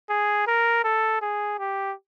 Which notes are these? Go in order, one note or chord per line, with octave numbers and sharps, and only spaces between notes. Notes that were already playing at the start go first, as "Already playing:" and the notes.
G#4
A#4
A4
G#4
G4